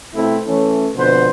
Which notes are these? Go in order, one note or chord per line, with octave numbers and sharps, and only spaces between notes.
B2 A3 C4 E4
E3 A3 C#4
F2 B2 D3 B4 C5